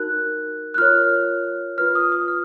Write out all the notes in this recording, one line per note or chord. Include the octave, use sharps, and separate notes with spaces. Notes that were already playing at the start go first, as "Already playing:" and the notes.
Already playing: D#4 F#4 A#4 F#6
F#6
F4 A#4 C#5 F6
F4 B4 F6
D#6
D#6
F6